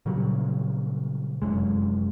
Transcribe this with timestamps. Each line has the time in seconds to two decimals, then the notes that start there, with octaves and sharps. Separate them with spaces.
0.06 A#2 C#3 F#3 G3
1.42 F1 F#2 G#3